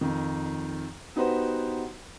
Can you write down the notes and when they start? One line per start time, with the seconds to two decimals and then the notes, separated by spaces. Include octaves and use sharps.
0.01 F2 D#3
1.16 B3 D#4 F#4 G4 B4 C5